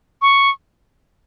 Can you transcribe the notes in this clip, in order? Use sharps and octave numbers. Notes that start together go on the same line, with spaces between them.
C#6